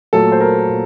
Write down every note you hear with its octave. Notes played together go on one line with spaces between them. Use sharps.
A#2 F#3 A3 A4
C5
A#4
A#2